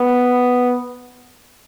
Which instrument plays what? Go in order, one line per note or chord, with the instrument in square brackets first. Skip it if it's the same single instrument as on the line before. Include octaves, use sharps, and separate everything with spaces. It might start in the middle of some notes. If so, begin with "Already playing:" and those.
Already playing: [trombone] B3